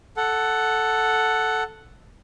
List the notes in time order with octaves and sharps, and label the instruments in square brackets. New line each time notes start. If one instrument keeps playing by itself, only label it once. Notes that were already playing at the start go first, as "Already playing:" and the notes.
[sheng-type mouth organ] A4 F#5